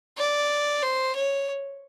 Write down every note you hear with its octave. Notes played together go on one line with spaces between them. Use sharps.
D5
C5
C#5